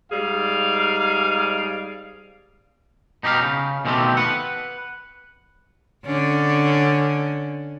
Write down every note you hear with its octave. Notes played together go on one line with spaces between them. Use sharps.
G#2 G3 G#4 F5
B2 D#4 G4 A#4 F5
C#3
B2 D#3 F3 A3 C4 G4
B4 F#5
D3 C#4 D4